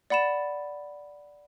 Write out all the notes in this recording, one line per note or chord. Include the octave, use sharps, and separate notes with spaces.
D5 F#5 B5 A6 E7